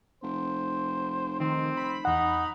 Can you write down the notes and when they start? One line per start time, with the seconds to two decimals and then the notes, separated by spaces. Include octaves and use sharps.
0.23 F1 C5
1.40 D#3 C4
1.77 B5
2.05 E2 D#4 F#5